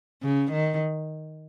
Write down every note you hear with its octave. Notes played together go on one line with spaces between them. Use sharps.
C#3
D#3